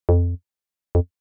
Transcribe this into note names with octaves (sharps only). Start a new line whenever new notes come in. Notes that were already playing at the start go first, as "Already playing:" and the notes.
F2
F2